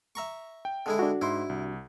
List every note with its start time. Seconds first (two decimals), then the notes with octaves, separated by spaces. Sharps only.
0.15 E5 A#5 C#6
0.65 G5
0.86 D3 G#3 E4
0.99 D4 F#4
1.21 G#2 E4 C6
1.49 C2